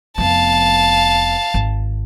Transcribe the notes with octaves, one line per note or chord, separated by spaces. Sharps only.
F1 B3 F5 A5
G#1